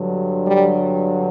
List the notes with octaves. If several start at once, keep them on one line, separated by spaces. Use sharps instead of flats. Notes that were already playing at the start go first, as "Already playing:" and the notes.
Already playing: G2 D3 F#3
G3